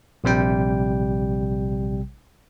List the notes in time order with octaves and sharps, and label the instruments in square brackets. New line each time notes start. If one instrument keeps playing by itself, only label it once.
[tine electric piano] A#1 C3 G3 G5